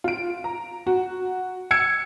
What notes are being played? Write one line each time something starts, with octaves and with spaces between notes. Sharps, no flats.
F4 D7
A#5
F#4
E6 G#6 C#7